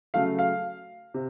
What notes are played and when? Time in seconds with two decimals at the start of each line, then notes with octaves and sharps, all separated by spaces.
0.14 C#3 F#3 A3 F5
0.39 F5
1.14 C3